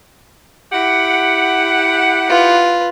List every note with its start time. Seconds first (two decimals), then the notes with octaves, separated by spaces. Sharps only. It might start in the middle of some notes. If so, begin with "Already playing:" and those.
0.72 E4 G4 F#5
2.27 F4 B4